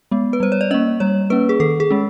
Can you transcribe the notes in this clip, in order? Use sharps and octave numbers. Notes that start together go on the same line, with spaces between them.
G#3 B3
B4
G3 C5
C#5
D5
A#3 C#4 D#5
G3 C#5
A#3 C#4 B4
G#4
D#3 A4
G#4
G#3 C#4